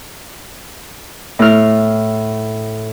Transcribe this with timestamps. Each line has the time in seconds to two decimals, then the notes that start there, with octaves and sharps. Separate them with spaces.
1.39 A2 F6